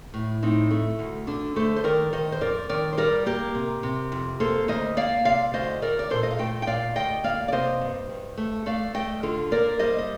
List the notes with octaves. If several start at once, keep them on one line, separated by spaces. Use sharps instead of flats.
A2
A2 C4 D#4
A3
D2
D3 D4
A3 A4 C5
C5
D#3 A#4 D5
D#3 C5 D#5
C5
F2 A#4 D5
D#3 A#4 D5
C5
G3 A#4 D5
A#3 G4 A#4
C3
C3
F2
A#3 A4 C5
D2 C5 D#5
A#3 D5 F5
C3 D5 F5
D2 C5 D#5
D2 A#4 D5
D5
A#2 A4 C5
D#5
F5
A3 D#5 G5
G5
A#2 D5 F5
D2 D#5 G5
A#3 D5 F5
D5
C3 C5 D#5
G2
G2
A3
A3 D5 F5
A3 D#5 G5
D3 F4 A4
A#3 A#4 D5
G3 C5 D#5
D#5